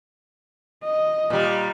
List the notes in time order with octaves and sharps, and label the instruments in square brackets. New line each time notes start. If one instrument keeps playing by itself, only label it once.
[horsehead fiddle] D#5
[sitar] A#2 G3